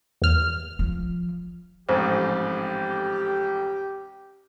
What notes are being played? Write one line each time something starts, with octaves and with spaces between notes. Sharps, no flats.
E2 F6
F3
A1 F2 G#2 G4 C5